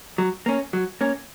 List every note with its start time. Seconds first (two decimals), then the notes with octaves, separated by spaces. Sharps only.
0.18 F#3
0.46 A#3 C#4
0.73 F#3
1.01 A#3 C#4